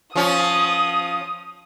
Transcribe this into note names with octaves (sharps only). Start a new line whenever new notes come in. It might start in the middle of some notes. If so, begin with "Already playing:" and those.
F3 C#4 D#6